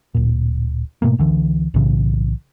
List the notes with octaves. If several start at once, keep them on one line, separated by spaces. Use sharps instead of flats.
D1 A#2
G#2 B2 A3 A#3
C#2 D3 E3
B1 A2 C#3 E3